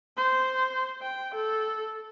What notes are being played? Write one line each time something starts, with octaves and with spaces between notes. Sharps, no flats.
C5
G5
A4